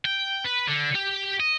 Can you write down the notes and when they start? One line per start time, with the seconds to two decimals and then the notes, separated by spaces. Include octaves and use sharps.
0.05 G5
0.45 B4
0.68 D3
0.95 G4
1.40 D#5